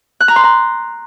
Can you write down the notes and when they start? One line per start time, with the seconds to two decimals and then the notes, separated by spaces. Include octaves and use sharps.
0.21 F#6
0.28 A#5
0.36 C6
0.44 A#5